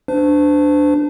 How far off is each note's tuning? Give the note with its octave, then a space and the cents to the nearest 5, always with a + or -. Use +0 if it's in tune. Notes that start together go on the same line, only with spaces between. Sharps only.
D4 +0 C5 -40